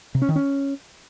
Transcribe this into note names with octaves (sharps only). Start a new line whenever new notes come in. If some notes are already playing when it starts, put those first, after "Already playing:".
C3
C#4
D#3
C#4